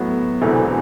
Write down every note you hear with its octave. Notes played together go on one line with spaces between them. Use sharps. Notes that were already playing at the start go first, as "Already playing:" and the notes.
Already playing: A2 F#3 B3
E1 D2 C3 E3 A3